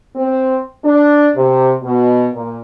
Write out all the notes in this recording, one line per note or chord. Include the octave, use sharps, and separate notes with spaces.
C4
D4
C3
B2
A#2